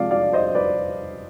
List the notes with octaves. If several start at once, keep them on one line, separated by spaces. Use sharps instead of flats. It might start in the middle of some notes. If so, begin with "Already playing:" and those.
Already playing: C3 F3 G#3 D5 F5
D5 F5
C5 D#5
B4 D5